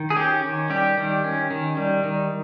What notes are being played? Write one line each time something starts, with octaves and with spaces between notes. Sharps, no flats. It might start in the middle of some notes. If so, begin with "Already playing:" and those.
Already playing: D#3
G#4
C#4 G4
D#3
G3 G4
D#3
C#4
D#3
G3
D#3